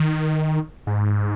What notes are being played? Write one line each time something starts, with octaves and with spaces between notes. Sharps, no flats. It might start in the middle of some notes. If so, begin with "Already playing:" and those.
Already playing: D#3
G#2